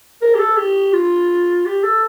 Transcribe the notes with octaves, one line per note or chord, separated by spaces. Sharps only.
A#4
G4
A4
G4
F4
G4
A4